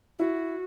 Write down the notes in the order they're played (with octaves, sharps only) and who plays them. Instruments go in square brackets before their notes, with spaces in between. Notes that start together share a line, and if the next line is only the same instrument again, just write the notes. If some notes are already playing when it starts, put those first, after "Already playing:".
[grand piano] E4 [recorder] F#4